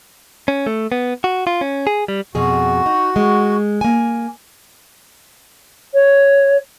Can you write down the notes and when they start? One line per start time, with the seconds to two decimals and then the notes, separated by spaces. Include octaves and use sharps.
0.48 C#4
0.67 A3
0.92 B3
1.24 F#4
1.47 F4
1.61 C#4
1.87 G#4
2.08 G3
2.35 F2 B2 F#4 G#4
2.86 D#4
3.16 G#3
3.81 A#3 G#5
5.94 C#5